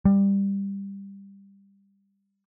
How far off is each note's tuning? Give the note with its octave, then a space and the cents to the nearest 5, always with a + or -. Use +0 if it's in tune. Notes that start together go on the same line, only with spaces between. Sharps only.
G3 +15